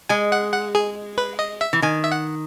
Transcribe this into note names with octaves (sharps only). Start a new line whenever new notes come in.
G#3 G#5
F#5
F#5
G#4
B4
D#5
E5
E3
D#3 G#5
E5
F#5